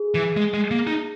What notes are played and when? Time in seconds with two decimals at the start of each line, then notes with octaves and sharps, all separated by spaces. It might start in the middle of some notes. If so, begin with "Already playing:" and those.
Already playing: G#4
0.15 E3
0.37 G#3
0.54 G#3
0.71 A#3
0.87 D#4